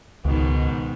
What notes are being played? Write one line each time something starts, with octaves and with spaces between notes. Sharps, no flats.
C#2 G#2 B2 D#3